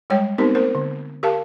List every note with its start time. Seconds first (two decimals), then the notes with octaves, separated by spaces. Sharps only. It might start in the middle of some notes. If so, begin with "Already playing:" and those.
0.10 G3 G#3 C#5 G5
0.38 B3 C4 D#4 G4 A#4 C5
0.55 A#3 A#4 C5
0.75 D3
1.23 G4 A#4 F5 A5